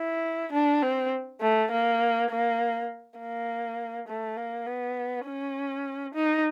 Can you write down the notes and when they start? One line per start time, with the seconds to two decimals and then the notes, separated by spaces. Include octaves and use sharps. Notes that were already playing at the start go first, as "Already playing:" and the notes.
Already playing: E4
0.53 D4
0.82 C4
1.41 A3
1.71 A#3
2.31 A#3
3.20 A#3
4.08 A3
4.37 A#3
4.66 B3
5.26 C#4
6.14 D#4